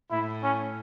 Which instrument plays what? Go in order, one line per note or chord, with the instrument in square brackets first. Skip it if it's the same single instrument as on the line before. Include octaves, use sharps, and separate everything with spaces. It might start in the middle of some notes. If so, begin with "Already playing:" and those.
[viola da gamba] A2 [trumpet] E4
[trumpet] C#4